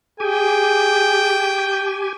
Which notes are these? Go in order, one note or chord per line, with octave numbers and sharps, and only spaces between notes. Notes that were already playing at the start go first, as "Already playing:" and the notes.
G4 G#4 G5 G#5